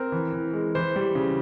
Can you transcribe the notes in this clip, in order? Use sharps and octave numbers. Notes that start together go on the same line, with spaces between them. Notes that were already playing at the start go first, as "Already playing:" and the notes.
Already playing: C4 A#4
E3
E3
G#3
E3 C5
G3
C#3